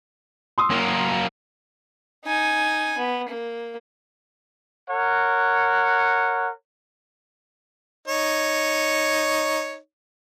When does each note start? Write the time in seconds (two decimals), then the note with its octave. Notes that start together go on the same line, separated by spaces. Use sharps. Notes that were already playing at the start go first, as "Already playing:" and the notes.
0.58 C6 D#6 E6
0.70 F#3 A#3
2.25 D#4 G#5
2.98 B3
3.28 A#3
4.89 A#4 C#5 F#5
8.08 D#4 C#5